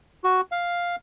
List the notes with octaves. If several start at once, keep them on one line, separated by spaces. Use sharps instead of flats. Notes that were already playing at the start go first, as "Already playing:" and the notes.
F#4
F5